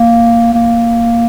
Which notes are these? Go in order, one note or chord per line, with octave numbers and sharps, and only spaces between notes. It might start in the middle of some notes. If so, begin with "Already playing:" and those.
Already playing: A#3
A#3